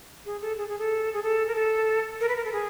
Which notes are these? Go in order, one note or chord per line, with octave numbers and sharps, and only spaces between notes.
G#4
A4
G#4
G#4
A4
G#4
A4
A#4
A4
A#4
B4
A#4
A4
G#4